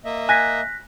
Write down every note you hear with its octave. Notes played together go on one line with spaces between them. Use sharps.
A#3 D#5 E5
G#5 F#6 A#6 B6